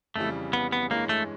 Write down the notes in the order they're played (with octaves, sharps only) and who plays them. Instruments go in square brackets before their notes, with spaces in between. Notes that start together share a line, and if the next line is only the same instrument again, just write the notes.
[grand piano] F2 C#3 E3 G3 [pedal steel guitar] A3
[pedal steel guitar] B3
B3
[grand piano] G2 E3 G#3 C#4 [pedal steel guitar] A#3
[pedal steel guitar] A3